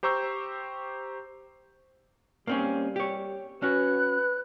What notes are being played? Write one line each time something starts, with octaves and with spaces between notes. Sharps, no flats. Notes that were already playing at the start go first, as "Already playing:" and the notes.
G4 C5 A#5 C#6 E6 G6
G3 A#3 C4 C#4
G4 C#5
C#4 F#4 B4 F#6